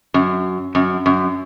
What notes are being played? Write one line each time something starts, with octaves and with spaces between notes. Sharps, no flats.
F#2
F#2
F#2